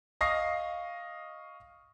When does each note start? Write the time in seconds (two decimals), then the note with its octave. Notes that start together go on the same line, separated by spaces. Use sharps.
0.21 D#5 F5 C#6 D#6 A#6 C7